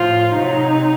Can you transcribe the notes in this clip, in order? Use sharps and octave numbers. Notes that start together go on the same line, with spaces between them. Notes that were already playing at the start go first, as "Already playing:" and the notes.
Already playing: A2 F3 F4
C3 F#3 D#4